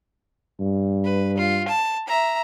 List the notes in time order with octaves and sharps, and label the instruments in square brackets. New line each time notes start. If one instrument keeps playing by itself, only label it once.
[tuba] G2
[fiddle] B4
F4
A5
E5 A#5